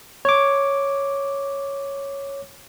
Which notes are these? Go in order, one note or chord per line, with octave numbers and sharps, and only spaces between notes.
C#5 D6